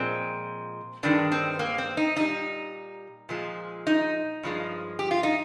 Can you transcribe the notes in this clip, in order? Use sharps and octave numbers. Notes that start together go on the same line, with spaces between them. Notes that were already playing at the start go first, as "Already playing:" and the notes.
Already playing: A#2 F3 G#3 C4
G2 D#3 G#3 D4
C4
A#3
C4
D#4
A#2 G3 D#4
A#2 F3 G#3
D#4
G2 F3 G#3
G4
F4
D#4